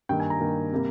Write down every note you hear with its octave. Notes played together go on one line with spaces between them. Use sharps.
G2 D#3 A#3 G5
G#5
A#5
G2 D#3 A#3
C3 G3 A#3